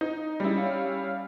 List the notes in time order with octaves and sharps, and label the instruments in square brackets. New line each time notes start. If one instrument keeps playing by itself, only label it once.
[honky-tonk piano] D#4
[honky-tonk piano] G3 E4 [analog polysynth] G#3 C#4
[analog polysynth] C#4 C#5 F5